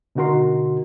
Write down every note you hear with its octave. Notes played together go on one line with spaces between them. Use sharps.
B2 D3 D#4 F#4 A#4 C6